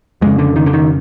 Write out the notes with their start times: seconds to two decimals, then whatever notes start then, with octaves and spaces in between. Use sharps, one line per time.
0.21 F2 C#3 G#3
0.38 D3
0.56 D#3
0.66 D3
0.73 D#3